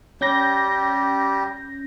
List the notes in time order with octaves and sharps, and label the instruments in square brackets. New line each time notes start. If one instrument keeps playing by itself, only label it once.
[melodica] G3 G4 [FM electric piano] C#4 G6 A#6